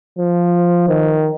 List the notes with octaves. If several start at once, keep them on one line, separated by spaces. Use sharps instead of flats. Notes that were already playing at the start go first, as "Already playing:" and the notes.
F3
D#3